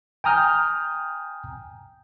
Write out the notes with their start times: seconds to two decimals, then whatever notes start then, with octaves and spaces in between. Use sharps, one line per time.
0.24 G5 G#5 A#5 D#6 F6 G6